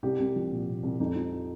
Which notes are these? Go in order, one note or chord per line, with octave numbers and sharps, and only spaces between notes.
C2 G4
C2
F3
A#2
C2
C2
F2 D#4
F3